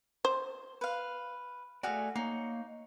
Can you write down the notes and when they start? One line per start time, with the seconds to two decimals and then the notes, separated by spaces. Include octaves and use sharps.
0.25 C5
0.81 B4 F5
1.83 A3 F#4 G#4 D5 F5
2.16 A#3 D#4 C#5